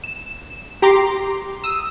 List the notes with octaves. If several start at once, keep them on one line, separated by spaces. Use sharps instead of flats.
E7
G4 A#5 C6 D6
D#6 E6